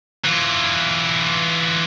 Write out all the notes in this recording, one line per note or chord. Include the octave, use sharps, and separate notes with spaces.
E3 F4